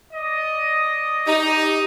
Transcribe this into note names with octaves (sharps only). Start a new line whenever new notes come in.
D5 D#5
D#4 G4